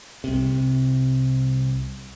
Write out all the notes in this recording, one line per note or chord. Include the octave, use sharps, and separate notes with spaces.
C2 C3